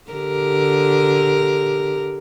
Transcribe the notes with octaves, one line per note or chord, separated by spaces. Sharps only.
D3 G4 A#4